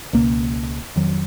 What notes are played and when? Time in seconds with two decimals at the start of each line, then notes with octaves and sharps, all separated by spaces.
0.13 C#2 B2 A#3
0.96 F2 D#3 F#3